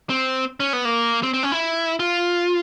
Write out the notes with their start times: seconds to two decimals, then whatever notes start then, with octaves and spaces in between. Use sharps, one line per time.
0.09 C4
0.60 C#4
0.73 B3
0.85 A#3
1.23 C4
1.34 C4
1.43 C#4
1.52 E4
2.00 F4